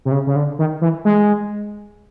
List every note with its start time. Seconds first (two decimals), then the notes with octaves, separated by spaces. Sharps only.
0.05 C3
0.12 C#3
0.27 C#3
0.36 D3
0.59 D#3
0.81 E3
1.05 G#3